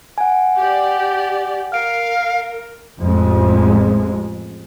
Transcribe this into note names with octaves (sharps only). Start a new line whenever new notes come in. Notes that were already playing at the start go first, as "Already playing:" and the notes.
F#5 G#5
G4 D5
A#4 F5 F6 D7
A1 F2 G#3